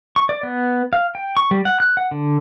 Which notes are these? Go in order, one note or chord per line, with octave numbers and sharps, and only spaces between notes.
C#6
D5
B3
F5
G5
C#6
G3
F#5
F#6
F#5
D3